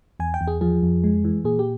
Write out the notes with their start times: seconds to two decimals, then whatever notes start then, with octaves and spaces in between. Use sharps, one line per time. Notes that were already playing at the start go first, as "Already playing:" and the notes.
0.20 E2 G#5
0.34 G5
0.41 E2
0.47 G#4
0.61 F3 G#4
0.82 F2
1.04 G#3
1.24 E3
1.44 A#2 G#4
1.59 G4